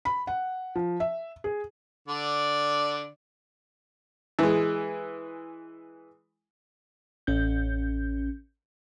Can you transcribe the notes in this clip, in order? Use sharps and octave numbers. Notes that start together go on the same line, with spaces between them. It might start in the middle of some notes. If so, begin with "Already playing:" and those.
B5
F#5
F3
E5
G#4
D3 D5
E3 G#3
A1 C#4 G6